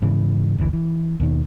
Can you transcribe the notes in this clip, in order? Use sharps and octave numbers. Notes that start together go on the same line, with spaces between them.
G#2 C#3 E3
F#1 D2 C3 E3
E3
D#2 B2 D#3